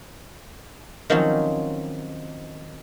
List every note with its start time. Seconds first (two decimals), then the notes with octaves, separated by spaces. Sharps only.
1.10 D#3 F3 F#3 C4 C#4 D#4